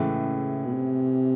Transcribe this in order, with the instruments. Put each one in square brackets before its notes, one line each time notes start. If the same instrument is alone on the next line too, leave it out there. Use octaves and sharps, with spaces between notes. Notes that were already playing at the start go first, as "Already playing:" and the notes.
Already playing: [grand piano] A2 E3 G#3 [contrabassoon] C#3
[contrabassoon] B2
C3